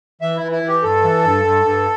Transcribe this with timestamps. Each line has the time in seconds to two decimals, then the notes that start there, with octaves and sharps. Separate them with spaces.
0.21 E3 E5
0.37 E3 E4
0.52 E4
0.62 E3
0.68 G4
0.82 G2 A4
1.03 E3
1.24 G2
1.44 G2
1.64 G2